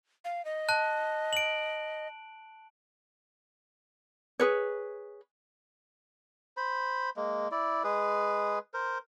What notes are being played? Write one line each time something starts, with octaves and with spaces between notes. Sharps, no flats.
F5
D#5
A5 F#6
D7 F#7
G#4 B4 C#5
C5 B5
G#3 A#3
E4 D5
G#3 G#4 B4
A#4 C5